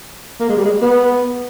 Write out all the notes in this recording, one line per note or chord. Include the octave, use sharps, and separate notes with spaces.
A#3
G#3
G3
G#3
B3